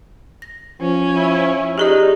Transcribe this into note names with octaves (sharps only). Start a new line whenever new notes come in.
A#6
F3 C#4
E4
D#4 G4 G#4 D5